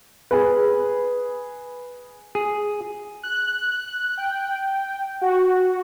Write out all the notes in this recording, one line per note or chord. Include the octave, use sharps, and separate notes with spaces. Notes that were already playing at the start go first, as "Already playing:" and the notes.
G#4 B4
G#4
F#6
G5
F#4